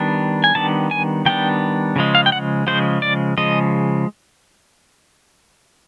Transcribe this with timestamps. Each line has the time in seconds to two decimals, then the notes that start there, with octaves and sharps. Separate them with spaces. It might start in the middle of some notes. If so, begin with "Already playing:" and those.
Already playing: D#3 G3 B3 D4
0.44 G#5
0.55 D#3 G3 B3 D4 A5
0.91 G#5
1.26 D#3 G3 B3 D4 G5
1.96 C#3 F3 G#3
2.15 F5
2.26 G5
2.32 F#5
2.67 C#3 F3 G#3 C5
3.02 D5
3.38 C#3 F3 G#3 D#5